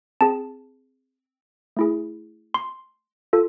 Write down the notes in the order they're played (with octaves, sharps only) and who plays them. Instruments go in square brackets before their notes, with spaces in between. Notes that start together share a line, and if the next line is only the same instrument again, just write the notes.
[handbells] C4 G#4 A5
A3 E4 G#4
C6
F4 A4